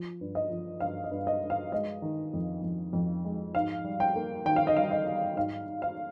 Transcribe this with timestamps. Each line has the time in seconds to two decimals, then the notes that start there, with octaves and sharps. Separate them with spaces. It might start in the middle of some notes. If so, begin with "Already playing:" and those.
Already playing: F3
0.21 G2
0.35 D#5
0.50 F3
0.80 G2 F5
1.04 D#5
1.11 G2
1.27 D#5
1.42 G2
1.50 F5
1.72 G#3 D#5
2.02 D#3
2.34 F2
2.63 F2
2.93 F2
3.25 G#3
3.55 G#2 F5
3.84 G3
4.00 G5
4.15 A#3
4.45 D#3 G5
4.56 F5
4.67 D#5
4.76 G3 F5
4.91 D#5
5.06 G3
5.36 G#2 F5
5.67 G#2
5.82 F5